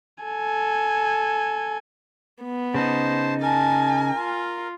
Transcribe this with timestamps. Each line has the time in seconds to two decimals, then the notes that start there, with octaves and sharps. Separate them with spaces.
0.24 A4 G#5
2.43 B3
2.74 C#3 D#4 C5 A5
3.42 A#4 G#5 A5
4.16 F4